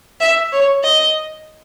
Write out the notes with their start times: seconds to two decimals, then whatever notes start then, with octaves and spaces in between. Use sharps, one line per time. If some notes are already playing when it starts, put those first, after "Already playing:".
0.20 E5
0.53 C#5
0.84 D#5